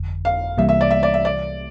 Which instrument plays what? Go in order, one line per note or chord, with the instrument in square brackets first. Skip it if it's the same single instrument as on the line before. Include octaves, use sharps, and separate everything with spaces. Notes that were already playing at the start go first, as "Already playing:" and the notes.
Already playing: [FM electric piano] G1 F2 D3
[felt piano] F5
[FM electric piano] C2 C3 E3 G3 A#3 [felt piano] E5
[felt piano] E5
D5
E5
D5
E5
D5